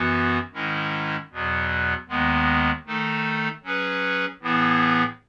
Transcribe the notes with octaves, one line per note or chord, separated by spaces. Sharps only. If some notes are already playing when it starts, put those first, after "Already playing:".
Already playing: F#2 E3 B3 F#4
G#2 D#3 G#3 C#4 E4
E2 B2 F#3
D#2 D#3 G#3 B3
D#3 A3 D#4 A4
F#3 C#4 G#4 B4
A2 E3 B3 E4 G#4